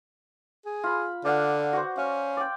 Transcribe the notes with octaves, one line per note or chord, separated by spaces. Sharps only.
G#4
F4 B5
D3 D5 F5 F#5
F#4 C5
C#4 F5
D5 G5